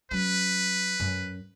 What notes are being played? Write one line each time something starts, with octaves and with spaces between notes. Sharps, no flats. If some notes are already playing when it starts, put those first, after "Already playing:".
F#3 C#4 B4
F#2